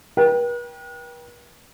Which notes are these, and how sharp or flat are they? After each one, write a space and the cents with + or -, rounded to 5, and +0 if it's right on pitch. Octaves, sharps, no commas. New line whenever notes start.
B4 -45 G5 +0